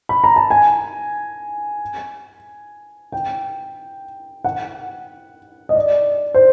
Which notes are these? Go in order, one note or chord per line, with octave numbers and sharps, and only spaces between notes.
B5
A#5
A5
G#5
G5
F#5
D#5
D5
C5